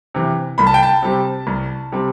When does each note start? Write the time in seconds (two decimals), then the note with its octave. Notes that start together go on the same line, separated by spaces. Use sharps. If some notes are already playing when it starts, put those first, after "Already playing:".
0.14 C3 E3
0.58 C2 B5
0.67 A5
0.74 G5
0.83 A5
1.02 C3 G3 C4
1.47 C2
1.92 C3 G3 C4